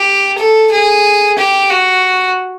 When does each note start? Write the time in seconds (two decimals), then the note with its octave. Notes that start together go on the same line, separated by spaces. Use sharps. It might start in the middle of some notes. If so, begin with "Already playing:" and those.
Already playing: G4
0.38 A4
0.71 G#4
1.38 G4
1.70 F#4